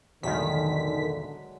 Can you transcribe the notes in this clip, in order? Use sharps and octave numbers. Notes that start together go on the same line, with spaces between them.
B1 E2 A2 D3 D#3 F#3 G#3 B6